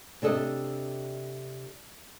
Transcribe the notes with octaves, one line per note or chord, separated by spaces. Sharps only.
C3 D4 A4 D#5